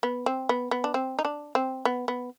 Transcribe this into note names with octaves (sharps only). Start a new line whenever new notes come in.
B3
C4
B3
B3
D4
C4
D#4
D4
C4
B3
B3